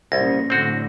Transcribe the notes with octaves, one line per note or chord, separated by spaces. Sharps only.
C2 A#2 C#3 F3 A#6
A2 D3 C4 F#4